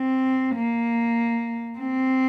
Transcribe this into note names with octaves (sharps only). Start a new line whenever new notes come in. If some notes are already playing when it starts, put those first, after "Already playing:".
Already playing: C4
A#3
C4